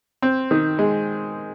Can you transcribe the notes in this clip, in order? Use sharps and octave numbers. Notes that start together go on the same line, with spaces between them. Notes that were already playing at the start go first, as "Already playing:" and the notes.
C4
D#3
G#3